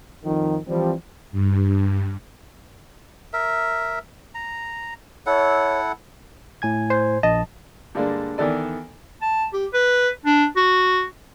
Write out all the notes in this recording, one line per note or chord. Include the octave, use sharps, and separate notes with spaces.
F2 D#3
E3 F3 G3 C4
G2
A#4 E5
A#5
E4 A4 C#5 F#5
A2 G#5 G#6
C5
A#1 D#5 A5
G2 D3 G#3 A#3 D4
D#3 E3 B3 A4 D5
A5
G4
B4
D4
F#4